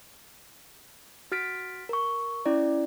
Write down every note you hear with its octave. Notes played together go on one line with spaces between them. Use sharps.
F#4 F6 A6 B6 D7
A#4 C#6
C#4 E4 D5